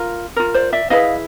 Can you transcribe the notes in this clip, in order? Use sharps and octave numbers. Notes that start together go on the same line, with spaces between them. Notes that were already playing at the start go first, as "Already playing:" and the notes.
Already playing: F4 A#4
F4 A#4
C5 D5
D5 E5
E4 G#4 B4 D#5 F5